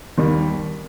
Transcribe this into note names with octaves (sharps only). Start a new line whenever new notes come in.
D#2 D#3 G3